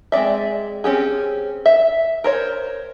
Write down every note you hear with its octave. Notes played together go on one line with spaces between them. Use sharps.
G#3 C4 D5 E5
C4 C#4 G4 G#4
E5
A#4 C5 C#5